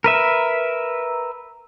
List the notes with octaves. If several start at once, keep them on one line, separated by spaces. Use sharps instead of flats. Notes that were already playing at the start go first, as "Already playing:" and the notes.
A#4 B4 E5